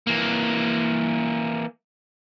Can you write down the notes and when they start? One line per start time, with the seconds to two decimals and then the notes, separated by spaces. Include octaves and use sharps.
0.07 E3 A#3